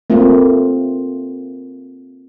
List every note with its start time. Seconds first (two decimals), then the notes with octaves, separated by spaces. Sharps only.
0.10 A3 A#3 C4 F4